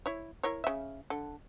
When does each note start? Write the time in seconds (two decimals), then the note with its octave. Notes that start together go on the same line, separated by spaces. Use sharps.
0.06 E4 C#5
0.43 E4 A#4 C#5
0.64 C#3 E5
1.10 D3 A4